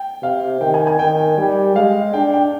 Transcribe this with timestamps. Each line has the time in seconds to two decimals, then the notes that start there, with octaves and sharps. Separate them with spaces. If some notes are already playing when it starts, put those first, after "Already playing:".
Already playing: G5
0.22 C3 F5
0.61 D#3 G5
0.74 G#5
0.87 G#5
0.99 D#3 G5
1.38 G3 G5
1.76 G#3 F5
2.13 D4 G5
2.34 G5